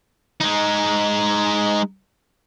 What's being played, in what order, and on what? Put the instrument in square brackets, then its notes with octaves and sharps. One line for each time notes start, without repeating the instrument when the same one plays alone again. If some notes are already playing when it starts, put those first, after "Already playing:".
[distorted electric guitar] G#3 D#4